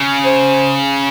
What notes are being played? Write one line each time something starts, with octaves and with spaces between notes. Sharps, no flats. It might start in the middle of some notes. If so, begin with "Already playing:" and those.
Already playing: C#3
C5